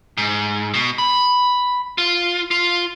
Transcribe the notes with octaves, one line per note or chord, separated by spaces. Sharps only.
G#2
B2
B5
F4
F4